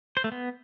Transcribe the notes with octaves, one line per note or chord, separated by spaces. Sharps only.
C5
A3
B3